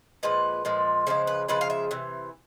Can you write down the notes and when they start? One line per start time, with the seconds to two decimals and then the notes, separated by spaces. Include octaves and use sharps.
0.23 A#2 F3 G#3 B4
0.65 A#2 F3 G#3
1.07 C#3 F3 G#3 C5
1.27 B4
1.48 C#3 F3 G#3 B4
1.61 F5
1.70 E5
1.91 C3 E3